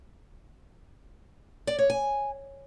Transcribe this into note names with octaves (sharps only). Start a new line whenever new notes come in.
D5
C#5
G#5